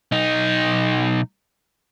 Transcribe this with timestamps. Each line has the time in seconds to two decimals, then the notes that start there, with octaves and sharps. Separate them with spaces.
0.12 B1 D#4